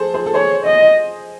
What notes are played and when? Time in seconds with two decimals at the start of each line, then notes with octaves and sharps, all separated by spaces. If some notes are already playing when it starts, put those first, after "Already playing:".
Already playing: G#4 A4 C5
0.14 G#4 C5
0.26 A4
0.34 G#4 C5 C#5
0.65 D#5